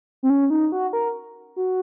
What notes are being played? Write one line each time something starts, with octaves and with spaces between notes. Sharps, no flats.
C4
C#4
D#4
F#4
A#4
F#4